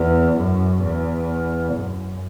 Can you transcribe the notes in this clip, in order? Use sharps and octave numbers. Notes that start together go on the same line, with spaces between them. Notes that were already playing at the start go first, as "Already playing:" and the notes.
Already playing: E2
F#2
E2
F#2